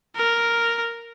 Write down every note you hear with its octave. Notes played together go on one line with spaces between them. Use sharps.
A#4